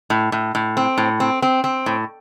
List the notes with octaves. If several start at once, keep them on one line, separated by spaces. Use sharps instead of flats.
A2
A2
A2
C4
A2
C4
C4
C4
A2